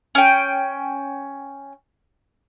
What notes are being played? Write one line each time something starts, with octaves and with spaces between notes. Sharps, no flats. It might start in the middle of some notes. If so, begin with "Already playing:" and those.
C#4 G5